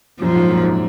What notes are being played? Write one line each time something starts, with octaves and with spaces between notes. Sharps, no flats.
F#2 A#2 F3
G#2
F#2 A#2
G#2